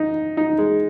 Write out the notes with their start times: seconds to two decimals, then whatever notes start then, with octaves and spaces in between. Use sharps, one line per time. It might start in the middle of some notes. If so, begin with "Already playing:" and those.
Already playing: D#4
0.37 D#4
0.59 G#3